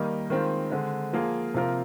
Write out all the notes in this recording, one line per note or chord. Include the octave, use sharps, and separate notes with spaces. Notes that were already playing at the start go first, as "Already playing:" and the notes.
Already playing: D#3 G3 A#3 D#4
D#3 G#3 C4 F4
D3 G#3 C4
F3 A#3 F4 G#4
C3 F3 C4 F4 A#4